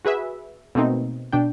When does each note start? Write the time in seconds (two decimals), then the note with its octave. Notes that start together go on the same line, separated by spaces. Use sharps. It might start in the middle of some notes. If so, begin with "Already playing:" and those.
0.05 F#4 G#4 B4 E5
0.75 B2 A3 A#3 C4 D#4
1.33 B2 D4 G5